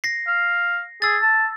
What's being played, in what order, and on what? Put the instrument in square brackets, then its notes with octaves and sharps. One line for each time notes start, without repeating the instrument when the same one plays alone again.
[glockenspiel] A#6 C7
[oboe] F5
[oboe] G#4 [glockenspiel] E6 A6
[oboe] A5